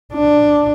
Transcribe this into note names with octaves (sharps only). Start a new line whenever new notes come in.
D4